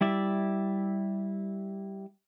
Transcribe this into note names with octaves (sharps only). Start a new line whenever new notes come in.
G3 E4 D5 E5